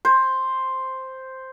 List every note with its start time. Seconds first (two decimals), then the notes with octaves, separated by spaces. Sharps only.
0.05 C5